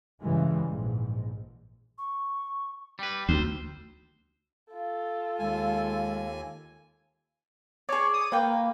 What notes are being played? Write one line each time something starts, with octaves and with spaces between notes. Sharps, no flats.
G2 C#3 E3 G3 G#3
A#1 G#2
C#6
G3 B4 G5
D2 C5
F4 A4
D#2 G#3 G#5
G#4 C#5 D5
D#6
A#3 B4 G5